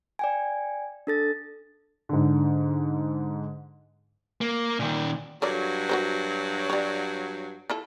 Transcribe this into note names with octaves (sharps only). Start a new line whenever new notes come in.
D5 G5 G#5
D4 A4 A6
G#2 D3
A#3
A#2 D#3
G2 F#3 A4 A#4 D5
F#4 A#4 C5
G3 C#5
E4 F4 A4